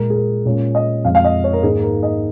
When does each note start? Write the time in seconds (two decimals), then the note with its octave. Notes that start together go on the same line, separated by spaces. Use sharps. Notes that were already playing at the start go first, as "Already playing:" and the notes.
Already playing: A#2 G#3 F4 A#4
0.10 G#4
0.16 A#4
0.46 A#2 G#3 C#4 F4
0.75 D#5
1.05 F2 F3 G#3 F5
1.15 F5
1.25 D#5
1.44 C#5
1.53 A#4
1.63 G#2 D#3 A#3 D#4 G#4
1.83 A#4
2.03 D#5